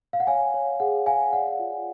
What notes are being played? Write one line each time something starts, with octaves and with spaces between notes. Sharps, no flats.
F5
F#5
C#5 F5 G#5
C#5
G#4 F#5
G#4 F5 G#5
D5 F#5
F4